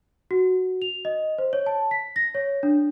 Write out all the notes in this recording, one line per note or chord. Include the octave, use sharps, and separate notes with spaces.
F#4
F7
D#5
C5
C#5
A5
B6
A#6
C#5
D4